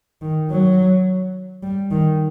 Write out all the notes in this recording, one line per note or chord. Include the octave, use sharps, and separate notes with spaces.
D#3
F#3
G3
D#3